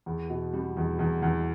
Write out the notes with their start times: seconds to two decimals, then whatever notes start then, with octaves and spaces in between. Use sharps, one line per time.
0.06 E2
0.30 B2
0.53 G3
0.77 E2
0.99 E2
1.22 E2